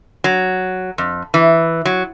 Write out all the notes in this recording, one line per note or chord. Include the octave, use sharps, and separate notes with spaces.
F#3
F2
E3
F#3